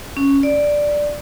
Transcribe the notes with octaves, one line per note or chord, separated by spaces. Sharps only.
C#4
D5